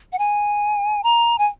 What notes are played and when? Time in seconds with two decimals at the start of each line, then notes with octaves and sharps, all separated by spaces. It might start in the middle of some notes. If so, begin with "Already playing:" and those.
0.13 F#5
0.19 G#5
1.03 A#5
1.38 G#5